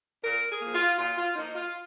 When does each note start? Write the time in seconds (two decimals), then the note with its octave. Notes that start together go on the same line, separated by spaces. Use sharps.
0.24 A#2 A#4
0.49 G#4
0.62 F3 A#3
0.74 F4
0.99 A#2 F4
1.18 F4
1.36 F3 A#3 D#4
1.55 F4